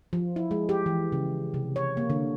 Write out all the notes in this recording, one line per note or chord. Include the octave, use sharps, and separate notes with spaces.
F3
E4
G#3
G4
E3
C#3
C3
C#5
A#3
D3